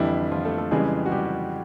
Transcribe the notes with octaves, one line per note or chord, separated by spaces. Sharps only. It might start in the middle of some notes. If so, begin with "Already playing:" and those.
Already playing: F2 D3 E3 G3 E4
F3 F4
A3 A4
A3 A4
F2 C#3 E3 G3 G#3 G#4
F#4
G3 G4